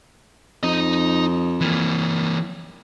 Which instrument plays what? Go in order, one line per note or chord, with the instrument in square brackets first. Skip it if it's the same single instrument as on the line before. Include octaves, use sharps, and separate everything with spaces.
[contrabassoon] F2 [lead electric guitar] D#4 D#5
[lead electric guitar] E3 A#3